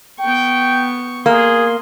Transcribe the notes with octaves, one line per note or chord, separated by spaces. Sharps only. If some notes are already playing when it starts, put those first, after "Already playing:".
B3 G5 C#6
A#3 G#4 C6